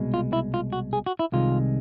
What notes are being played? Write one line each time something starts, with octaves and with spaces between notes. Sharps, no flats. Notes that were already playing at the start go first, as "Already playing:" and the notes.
Already playing: C2 B2 G#3
F4
E4
F4
F#4
G#4
F#4
E4
C2 C3 D#3 G#3 F4